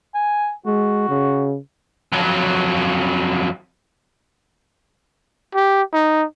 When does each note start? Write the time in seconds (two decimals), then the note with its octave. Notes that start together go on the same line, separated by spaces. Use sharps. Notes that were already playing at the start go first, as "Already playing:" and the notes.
0.14 G#5
0.66 G#3 F#4
1.09 C#3
2.12 F2 F#3
5.55 G4
5.93 D#4